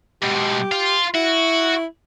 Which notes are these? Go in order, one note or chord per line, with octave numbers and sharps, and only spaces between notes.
G#2 B2 G4
F4
E4 F#4